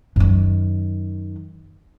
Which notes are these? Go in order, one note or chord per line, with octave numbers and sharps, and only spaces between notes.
F#2 D#3